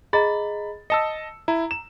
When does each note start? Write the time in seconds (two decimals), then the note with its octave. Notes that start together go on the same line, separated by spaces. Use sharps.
0.13 G#4 D#5 A#5 B5 A6
0.90 D#5 A5 E6 C#7
1.48 E4 A#5
1.71 E7